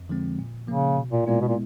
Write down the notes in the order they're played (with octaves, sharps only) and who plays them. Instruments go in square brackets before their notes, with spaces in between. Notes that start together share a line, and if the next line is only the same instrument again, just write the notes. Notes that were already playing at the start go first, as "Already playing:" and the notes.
Already playing: [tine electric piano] F2
D3 F3 G#3 C4
A#2
[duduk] C#3 [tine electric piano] F3 A#3
[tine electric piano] B2
[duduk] A#2
[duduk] A#2 [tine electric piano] G#3 B3 E4
[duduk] B2
A#2